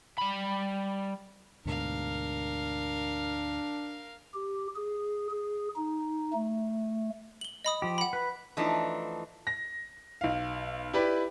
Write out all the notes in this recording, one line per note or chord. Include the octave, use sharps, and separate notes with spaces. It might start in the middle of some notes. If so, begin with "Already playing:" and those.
G3 B5
D2 G#2 B2 D4 A#4 F5
G4
G#4
G#4
D#4
A3
F#7 G7
D#5 B5 D#6
F3 G4
F#5 B5
B4
E3 F3 A3 D4 D#4
A#6
B1 F5
E4 G4 B4 D5 B5